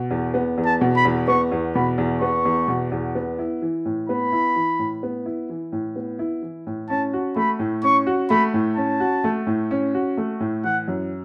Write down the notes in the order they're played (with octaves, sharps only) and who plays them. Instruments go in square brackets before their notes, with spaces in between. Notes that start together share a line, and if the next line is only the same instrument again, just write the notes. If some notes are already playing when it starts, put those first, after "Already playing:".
Already playing: [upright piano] B2
E2
B3
E2
[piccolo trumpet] A5
[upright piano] B2
[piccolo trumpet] B5
[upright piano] E2
[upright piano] B3 [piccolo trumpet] C#6
[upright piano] E2
[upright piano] B2 [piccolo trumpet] B5
[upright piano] E2
[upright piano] B3 [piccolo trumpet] C#6
[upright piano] E2
B2
E2
B3
E4
E3
A2
[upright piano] B3 [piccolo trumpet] B5
[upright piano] E4
E3
A2
B3
E4
E3
A2
B3
E4
E3
A2
[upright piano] C#4 [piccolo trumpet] A5
[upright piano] F#4
[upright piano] A3 [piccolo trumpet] B5
[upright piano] A2
[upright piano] C#4 [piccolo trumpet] C#6
[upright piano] F#4
[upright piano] A3 [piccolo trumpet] B5
[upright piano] A2
[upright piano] C#4 [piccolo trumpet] A5
[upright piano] F#4
A3
A2
C#4
F#4
A3
A2
[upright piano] E3 [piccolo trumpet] F#5
[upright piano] F#2